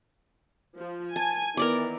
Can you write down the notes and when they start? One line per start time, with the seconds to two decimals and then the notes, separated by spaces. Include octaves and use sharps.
0.78 F3
1.16 G#5 A5
1.57 D#3 E3 B3 A#4 D5 D6